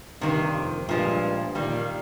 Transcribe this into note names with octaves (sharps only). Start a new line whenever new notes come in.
G2 C3 D#3 A#3
F2
G2 A#2 F3 G#3
A#2 D#3 G3 A#3